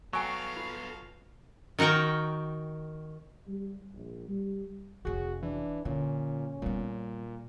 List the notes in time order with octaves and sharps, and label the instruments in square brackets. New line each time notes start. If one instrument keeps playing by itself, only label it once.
[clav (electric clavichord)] F#3 [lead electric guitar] B3 A4 [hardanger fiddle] F5 [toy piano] G5 G#5 C#6
[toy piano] F4
[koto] D#3 D#4 F#4 A#4 G5
[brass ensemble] G3
A#1
G3
[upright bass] F1 C#4 [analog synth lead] F#4 [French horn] G#4
[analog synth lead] E3 [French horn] D4
[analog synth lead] A#2 [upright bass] D3 [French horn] C#4
[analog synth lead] A#2 [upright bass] G3 B3